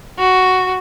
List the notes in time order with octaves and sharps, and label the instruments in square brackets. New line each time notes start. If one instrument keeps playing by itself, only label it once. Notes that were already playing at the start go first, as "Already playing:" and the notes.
[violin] F#4